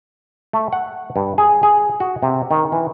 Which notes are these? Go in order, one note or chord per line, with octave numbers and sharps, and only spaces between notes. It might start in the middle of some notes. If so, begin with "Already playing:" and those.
A3
F#5
G2
G#4
G#4
F#4
C3
D#3
E3